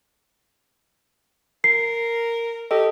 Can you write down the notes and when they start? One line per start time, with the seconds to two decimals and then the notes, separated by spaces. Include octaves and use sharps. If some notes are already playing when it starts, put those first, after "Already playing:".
1.64 A#4 C7
2.71 G4 A4 D#5